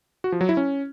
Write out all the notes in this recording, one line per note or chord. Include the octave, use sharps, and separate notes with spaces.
F#4
F3
F#3
E4
C#4